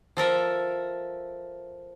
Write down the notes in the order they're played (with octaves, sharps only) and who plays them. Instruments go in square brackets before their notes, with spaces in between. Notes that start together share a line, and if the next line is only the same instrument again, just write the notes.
[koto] F3 A4 A#4 E5